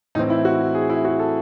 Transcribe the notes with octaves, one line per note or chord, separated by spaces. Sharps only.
A2 E3 C4 D#4
E4
F#4
G#4
E4
F#4
A4